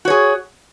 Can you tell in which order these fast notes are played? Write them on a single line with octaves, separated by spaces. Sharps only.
F#4 C#5 G#4